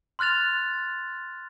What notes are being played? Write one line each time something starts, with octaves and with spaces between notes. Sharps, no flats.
C6 F6 F#6 A6 F7